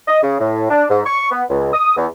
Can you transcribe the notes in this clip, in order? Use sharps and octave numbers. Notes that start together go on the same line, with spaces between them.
D#5
C#3
A2
D4
G#2
C#6
B3
C#2
D#6
E2